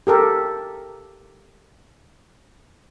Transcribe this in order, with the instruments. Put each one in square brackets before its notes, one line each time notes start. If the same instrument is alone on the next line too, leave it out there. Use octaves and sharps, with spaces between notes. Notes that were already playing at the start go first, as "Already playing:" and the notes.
[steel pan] G4 A4 A#4